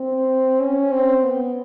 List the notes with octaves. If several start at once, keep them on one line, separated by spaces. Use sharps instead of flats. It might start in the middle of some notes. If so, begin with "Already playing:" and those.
Already playing: C4
C#4
C4
B3